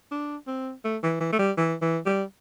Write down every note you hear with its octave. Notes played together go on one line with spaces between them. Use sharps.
D4
C4
A3
E3
E3
A3
G3
E3
E3
G3